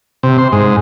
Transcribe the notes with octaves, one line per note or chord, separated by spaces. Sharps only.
C3
C5
G#2